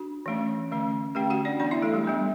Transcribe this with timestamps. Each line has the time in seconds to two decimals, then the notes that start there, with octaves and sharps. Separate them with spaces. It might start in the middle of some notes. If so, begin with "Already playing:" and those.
Already playing: D4 F#4
0.26 E3 A3 C#4
0.71 D3 A3 C#4
1.15 D3 A3 C#4 G4 G5
1.30 F#4 F#5
1.45 D4 D5
1.60 E3 B3 D4 D5
1.71 E4 E5
1.83 A3 A4
1.94 G3 G4
2.05 G3 B3 D4